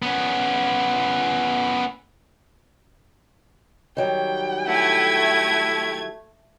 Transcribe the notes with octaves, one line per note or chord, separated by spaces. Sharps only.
B3 C#4
D#3 F#3 G3 G5
A3 E4 G#6